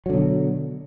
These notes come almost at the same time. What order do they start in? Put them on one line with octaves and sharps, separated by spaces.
F#3 D3 B2